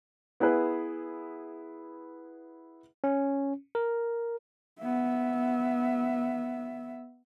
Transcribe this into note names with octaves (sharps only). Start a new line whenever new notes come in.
B3 E4 G#4 B4
C#4
A#4
B3 E5